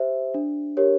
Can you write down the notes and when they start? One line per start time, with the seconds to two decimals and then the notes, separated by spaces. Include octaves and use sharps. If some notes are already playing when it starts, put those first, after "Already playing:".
Already playing: G4 C5 E5
0.34 D4
0.77 G4 A#4 C#5